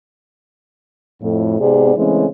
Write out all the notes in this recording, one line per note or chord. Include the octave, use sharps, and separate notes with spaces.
F2 A2
G#2 C3 B3 C4 G#4 D5
C#3 E3 G#3 A3 C4 C#4